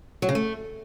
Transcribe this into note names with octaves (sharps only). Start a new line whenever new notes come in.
F#3
C#3
A3